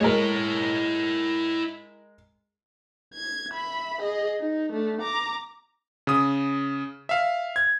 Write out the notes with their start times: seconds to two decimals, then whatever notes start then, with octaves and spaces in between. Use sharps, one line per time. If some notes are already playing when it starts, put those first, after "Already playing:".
0.01 G#3 E4 A#4 C#5
3.14 G#6
3.51 E5 B5
4.01 G#4 D#5
4.40 D#4
4.73 A3 D4
5.01 A#5 D6
6.07 C#3 D#6
7.09 E5 F5
7.56 G#6